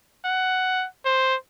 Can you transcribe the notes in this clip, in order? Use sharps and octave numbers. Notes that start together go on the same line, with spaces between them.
F#5
C5